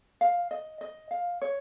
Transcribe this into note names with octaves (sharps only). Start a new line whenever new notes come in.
F5
D#5
D#5
F5
C#5